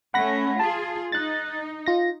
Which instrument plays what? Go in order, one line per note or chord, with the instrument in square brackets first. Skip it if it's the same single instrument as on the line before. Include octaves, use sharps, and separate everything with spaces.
[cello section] A3 C#4 [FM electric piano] F#5 B5 A#6
[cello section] F4 G#4 [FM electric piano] A5
[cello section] D#4 [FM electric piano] F#6 A6
[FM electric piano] F4 A#6